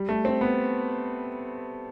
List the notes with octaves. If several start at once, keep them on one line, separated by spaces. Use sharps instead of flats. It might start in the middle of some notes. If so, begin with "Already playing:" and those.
Already playing: G3
A3
C4
B3